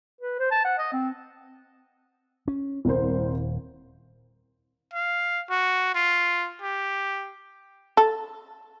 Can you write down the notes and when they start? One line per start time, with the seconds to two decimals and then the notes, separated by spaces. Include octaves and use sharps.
0.21 B4
0.39 C5
0.51 A5
0.65 F#5
0.78 D#5
0.93 C4
2.48 C#4
2.85 D#1 C2 A#4 C5
4.93 F5
5.50 F#4
5.95 F4
6.62 G4
7.97 A4